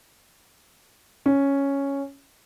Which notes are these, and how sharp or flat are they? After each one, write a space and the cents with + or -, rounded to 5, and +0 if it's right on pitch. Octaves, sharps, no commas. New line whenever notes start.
C#4 +0